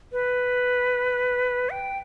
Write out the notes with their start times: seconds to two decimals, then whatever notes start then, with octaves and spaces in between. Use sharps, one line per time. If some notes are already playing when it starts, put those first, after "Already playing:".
0.12 B4
1.70 G5